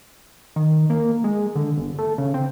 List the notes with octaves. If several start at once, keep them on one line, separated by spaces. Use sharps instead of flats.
D#3
A#3
G#3
D3
G1
A3
C#3
C4